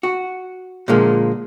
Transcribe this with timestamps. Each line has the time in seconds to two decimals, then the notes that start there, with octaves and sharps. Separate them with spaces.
0.03 F#4
0.88 A#2 D3 F3 G#3 A#3